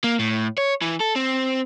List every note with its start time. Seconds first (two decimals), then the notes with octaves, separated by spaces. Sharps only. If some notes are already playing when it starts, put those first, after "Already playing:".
0.04 A#3
0.19 A2
0.58 C#5
0.81 E3
1.00 A4
1.16 C4